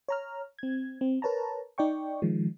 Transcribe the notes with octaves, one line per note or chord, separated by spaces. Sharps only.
C#5 A#5 F6
C4 G#6
C4
A#4 B4 C#5 A5 A#5
D#4 D5 G5 C#6
D#3 F3 G#3